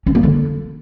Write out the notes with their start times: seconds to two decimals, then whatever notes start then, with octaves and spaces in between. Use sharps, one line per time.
0.06 C#4
0.15 A#3
0.23 D3